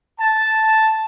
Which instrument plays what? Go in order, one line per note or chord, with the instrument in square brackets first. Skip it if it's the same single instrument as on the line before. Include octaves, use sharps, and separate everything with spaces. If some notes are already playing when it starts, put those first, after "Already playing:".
[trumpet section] A5